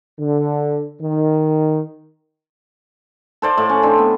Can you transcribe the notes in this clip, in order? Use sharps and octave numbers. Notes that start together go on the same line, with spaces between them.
D3
D#3
A4 C5 D5 F5
A2
C#4
C4 D4
B3